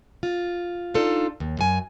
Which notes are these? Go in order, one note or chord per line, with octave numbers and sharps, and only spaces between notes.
F4
D4 D#4 F4 A4
D#2
F#2 G#5